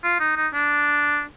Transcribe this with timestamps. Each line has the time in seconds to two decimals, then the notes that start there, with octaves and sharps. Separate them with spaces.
0.04 F4
0.20 D#4
0.36 D#4
0.53 D4